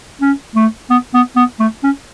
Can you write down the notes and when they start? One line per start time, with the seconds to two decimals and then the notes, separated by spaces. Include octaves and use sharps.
0.21 C#4
0.55 A3
0.90 B3
1.14 B3
1.36 B3
1.60 A3
1.83 C#4